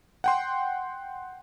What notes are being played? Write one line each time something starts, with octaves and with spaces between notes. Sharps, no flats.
F#5 G5 C6